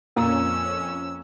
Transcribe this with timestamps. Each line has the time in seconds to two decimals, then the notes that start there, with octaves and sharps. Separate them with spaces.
0.17 F2 A#2 C#4 E6